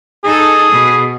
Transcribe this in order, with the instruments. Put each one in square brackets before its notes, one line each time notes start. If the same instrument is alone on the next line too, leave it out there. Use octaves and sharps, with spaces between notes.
[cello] D#4 A4 [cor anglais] G#4
[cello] B2